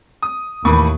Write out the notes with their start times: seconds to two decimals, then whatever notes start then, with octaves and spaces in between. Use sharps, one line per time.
0.23 D#6
0.65 D#2 A2 D#3 E3 B5 C#6 D6